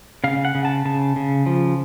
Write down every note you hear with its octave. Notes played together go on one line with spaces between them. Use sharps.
C#3 F5
F#5
C#3
A5
C#3 A5
C#3
F3